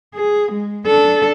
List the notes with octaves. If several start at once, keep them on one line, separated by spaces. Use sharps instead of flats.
G#4
G#3
D4 A4